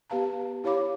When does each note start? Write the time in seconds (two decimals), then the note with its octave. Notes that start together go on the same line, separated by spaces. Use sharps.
0.10 B3 G4 B4 F5 A5 A#5
0.64 E4 G4 C#5 F5 B5 D6